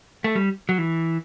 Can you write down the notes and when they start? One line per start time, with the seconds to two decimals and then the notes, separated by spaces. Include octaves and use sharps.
0.24 A3
0.35 G3
0.69 F#3
0.78 E3